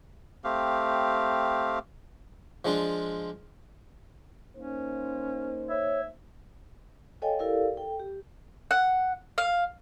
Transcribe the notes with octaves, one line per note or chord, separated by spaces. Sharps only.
A3 C4 G4 F5
F3 G#3 D4 F4
A#3 C#4 D#4 C5
C#5 E5
A4 C#5 D#5 F5 G5 G#5
E4 G4 A4 A#4 D5 F5
A4 G5
G4
F#5
F5